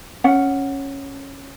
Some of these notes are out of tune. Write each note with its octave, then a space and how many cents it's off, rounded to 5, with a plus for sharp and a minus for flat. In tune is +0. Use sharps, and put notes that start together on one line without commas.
C#4 -10 F#5 +0